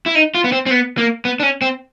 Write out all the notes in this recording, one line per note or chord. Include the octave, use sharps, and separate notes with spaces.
E4
D#4
F4
B3
C4
C4
B3
A#3
B3
D4
C#4
C4